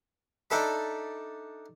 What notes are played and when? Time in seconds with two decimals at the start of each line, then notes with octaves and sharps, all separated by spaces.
0.50 D4 D#4 A4 E5 B5